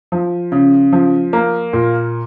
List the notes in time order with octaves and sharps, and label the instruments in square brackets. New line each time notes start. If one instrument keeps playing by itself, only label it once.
[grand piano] F3
C#3
F3
A#3
A#2